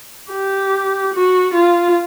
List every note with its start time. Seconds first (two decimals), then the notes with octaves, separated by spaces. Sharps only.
0.31 G4
1.14 F#4
1.54 F4